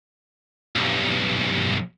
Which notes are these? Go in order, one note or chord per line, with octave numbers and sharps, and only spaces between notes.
B1 G2